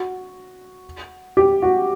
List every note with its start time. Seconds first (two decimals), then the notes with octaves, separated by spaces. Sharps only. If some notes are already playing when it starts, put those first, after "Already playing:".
Already playing: F#4
1.37 G4
1.62 F#4